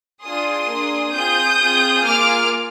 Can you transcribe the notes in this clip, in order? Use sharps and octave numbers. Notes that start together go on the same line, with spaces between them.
D4 F4 G#4 C6 D#6
A#3 D4 G#4
C4 F4 G#4 D#6 G6
C4 F4 G#4
A#3 F4 G#4 D6 F6